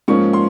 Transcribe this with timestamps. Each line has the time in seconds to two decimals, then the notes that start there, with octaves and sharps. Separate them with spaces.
0.08 G#2 F3 A#3 C#4 C#6
0.33 C6